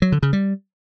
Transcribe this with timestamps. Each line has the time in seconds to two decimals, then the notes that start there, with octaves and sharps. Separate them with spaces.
0.02 F#3
0.12 D3
0.23 C#3
0.33 G3